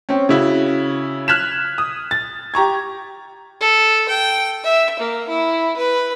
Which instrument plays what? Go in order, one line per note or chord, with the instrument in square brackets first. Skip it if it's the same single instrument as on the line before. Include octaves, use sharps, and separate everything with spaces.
[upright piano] C4 C#4
C#3 E4 F#4
F6 F#6 G#6 B6 E7
D#6
A6
G4 A#5 C#6 G#6
[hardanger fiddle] A4
G5
E5
A#3
E4
B4